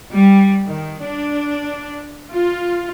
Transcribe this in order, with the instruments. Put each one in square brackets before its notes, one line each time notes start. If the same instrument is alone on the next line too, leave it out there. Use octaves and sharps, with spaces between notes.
[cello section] G3
D#3
D4
F4